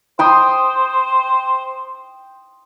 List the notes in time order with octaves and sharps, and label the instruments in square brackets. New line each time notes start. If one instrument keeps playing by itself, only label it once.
[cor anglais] C5 [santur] G5 C6 D#6